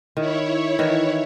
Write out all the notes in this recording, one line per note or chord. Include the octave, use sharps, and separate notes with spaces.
D#3 E4 C#5
D#3 E3